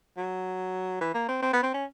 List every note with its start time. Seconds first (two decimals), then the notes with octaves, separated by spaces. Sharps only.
0.18 F#3
1.01 E3
1.14 A#3
1.28 C4
1.42 C4
1.53 B3
1.63 C4
1.74 C#4